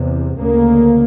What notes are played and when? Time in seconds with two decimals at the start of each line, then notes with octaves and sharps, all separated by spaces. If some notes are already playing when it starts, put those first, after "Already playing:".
Already playing: E2 C3
0.39 D2 C#3 A#3